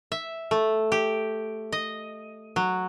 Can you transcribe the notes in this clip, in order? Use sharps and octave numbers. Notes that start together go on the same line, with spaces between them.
E5
A3
G4
D#5
F#3